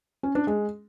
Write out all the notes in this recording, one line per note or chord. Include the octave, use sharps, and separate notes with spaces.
C#4
D4
G#3